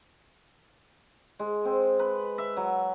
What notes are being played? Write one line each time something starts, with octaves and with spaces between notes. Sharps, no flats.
G#3
C4
B4
E5
F#3